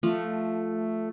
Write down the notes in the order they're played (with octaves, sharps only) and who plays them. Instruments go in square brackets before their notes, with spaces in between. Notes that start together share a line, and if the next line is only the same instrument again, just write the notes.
[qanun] F3 [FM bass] A3